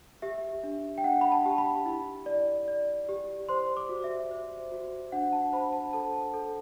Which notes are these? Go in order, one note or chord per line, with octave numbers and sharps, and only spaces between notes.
G4 E5
D4
G5
D4 F#5
B5
A5
G4
B5
E4
D5
D5
G4
C5 C6
D6
F#4
E5
C5
F#4
D4 F#5
A5
C5 B5
A5
A4 A5
A4